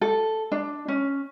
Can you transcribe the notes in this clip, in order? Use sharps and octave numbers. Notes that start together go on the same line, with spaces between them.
A4
D4
C#4